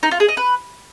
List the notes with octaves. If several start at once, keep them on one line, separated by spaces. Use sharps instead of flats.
D#4
F4
G#4
D#5
B4